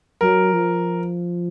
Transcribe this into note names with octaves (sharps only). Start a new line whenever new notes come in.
F#3 A#4
F3